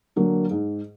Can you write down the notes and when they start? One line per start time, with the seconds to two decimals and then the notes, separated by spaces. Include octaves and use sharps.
0.16 D3 F#3 A#3
0.50 G#2